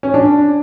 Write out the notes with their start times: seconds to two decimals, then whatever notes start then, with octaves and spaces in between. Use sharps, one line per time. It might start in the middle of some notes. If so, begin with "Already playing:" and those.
0.03 C#4
0.14 D4